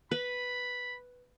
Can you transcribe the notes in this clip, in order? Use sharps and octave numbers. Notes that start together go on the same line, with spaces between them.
B4 B5